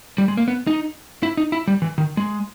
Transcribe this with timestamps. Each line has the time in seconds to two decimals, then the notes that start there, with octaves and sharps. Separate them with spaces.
0.18 G3
0.28 G#3
0.37 A#3
0.48 B3
0.67 D#4
1.23 E4
1.37 D#4
1.52 E4
1.68 G3
1.82 E3
1.98 D#3
2.17 G#3